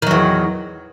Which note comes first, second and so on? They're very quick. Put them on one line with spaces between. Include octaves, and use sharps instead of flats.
D#3 F#3 E2